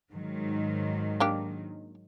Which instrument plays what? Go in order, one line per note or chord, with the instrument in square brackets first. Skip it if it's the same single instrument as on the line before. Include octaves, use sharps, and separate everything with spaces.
[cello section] G#2 D#3 F#3
[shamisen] A#3 D4 G4